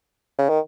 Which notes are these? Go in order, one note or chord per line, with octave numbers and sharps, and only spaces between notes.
C#3
D#3